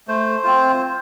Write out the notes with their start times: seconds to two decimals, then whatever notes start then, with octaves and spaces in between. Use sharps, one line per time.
0.08 A3 C5
0.44 C4 F4